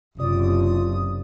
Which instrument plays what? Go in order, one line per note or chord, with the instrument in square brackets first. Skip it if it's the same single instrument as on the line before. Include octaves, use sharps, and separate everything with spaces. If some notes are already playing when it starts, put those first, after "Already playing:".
[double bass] F#1 [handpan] C3 D5 [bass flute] F4 [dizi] D#6